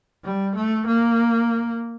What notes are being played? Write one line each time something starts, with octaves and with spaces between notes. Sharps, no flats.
G3
A3
A#3